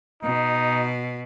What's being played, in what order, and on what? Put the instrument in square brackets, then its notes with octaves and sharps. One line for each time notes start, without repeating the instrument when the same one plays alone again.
[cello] B2 [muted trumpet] D#4